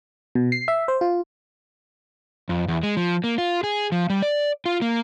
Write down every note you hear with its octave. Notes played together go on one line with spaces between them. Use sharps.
B2
C7
E5
C5
F4
F2
E2
G#3
F3
A#3
F4
G#4
F3
G3
D5
F4
A#3